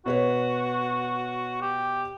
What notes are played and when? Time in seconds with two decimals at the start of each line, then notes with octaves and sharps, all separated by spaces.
0.06 B2 F#4 B4 C#5
1.62 G4